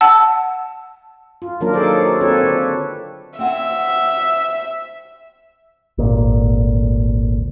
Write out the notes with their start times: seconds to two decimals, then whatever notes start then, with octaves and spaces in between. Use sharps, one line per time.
0.01 F#5 A5 E6
1.42 F4
1.61 D#3 F#3 A#3 D4 F4 A#4
1.74 G#4 A4 C5 D5
2.01 F#4
2.20 C4 D4 F4 A4 B4 C#5
2.43 D3 D5
3.39 C4 E5 F#5 G#5
5.98 G#1 D2 A#2